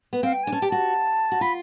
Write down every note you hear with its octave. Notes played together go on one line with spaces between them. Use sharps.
B3
C4 F5
G5
D4 G#5
C#4 A5
G4
F#4 A5
F#4
F4 B5